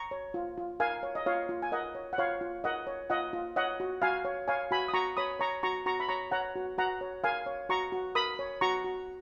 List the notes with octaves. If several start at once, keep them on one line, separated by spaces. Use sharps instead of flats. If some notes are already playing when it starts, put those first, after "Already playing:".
Already playing: A#5 C#6
C#5
F4
F4
A#4 F5 G#5
C#5
D#5
F4 C#5 F5
F4
G#5
A#4 D#5 F#5
C#5
F#5
F4 C#5 F5
F4
A#4 D#5 F#5
C#5
F4 D#5 F#5
F4
C#5 D#5 F#5
F#4
F#4 F5 G#5
C#5
C#5 F5 G#5
F#4 G#5 B5
D#6
F#4 A#5 C#6
C#5 B5 D#6
C#5 A#5 C#6
F#4 A#5 C#6
F#4 A#5 C#6
B5
C#5 A#5 C#6
C#5 F#5 A#5
F#4
F#4 F#5 A#5
C#5
A#4 F5 G#5
C#5
F#4 A#5 C#6
F#4
A#4 B5 D#6
C#5
F#4 A#5 C#6
F#4